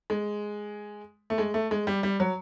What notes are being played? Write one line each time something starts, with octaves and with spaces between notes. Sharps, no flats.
G#3
A3
G#3
A3
G#3
G3
G3
F#3